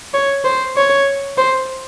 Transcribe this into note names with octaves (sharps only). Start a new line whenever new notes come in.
C#5
C5
C#5
C5